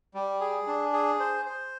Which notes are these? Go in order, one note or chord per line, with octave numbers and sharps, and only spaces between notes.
G3
G#4
D4
G#4
C5
C5